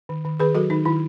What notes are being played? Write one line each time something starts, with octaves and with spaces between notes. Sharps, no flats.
D#3
D#3
D#3 G#4 B4
F#3 F#4 A4
D#3 D#4
D#3 E4